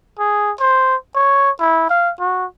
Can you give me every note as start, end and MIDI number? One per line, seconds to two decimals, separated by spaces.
0.19 0.51 68
0.60 0.96 72
1.15 1.51 73
1.60 1.88 64
1.90 2.11 77
2.20 2.45 66